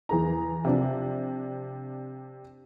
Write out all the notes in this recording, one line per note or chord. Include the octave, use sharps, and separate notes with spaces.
E2 G#4 A#5
C3 F3 D4